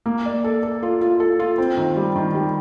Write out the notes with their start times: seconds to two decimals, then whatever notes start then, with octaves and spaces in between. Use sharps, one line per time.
0.06 A#3
0.26 D5
0.44 A4
0.63 A4
0.83 F4
1.01 F4
1.20 A4
1.39 F4
1.58 C4
1.77 D#3
1.96 G3
2.16 D#3
2.35 G3